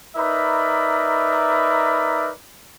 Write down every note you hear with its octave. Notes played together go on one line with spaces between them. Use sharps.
D#4 A#4 B4 D5 E5 B5